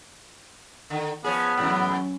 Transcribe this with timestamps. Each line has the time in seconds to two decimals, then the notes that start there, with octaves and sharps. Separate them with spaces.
0.90 D3 D#3
1.24 F3 B3 C#4 G#4
1.58 G#2 E3 F#3 C#4